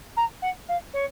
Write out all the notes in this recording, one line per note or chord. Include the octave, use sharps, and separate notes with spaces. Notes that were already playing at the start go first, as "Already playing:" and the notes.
A#5
F#5
F5
C#5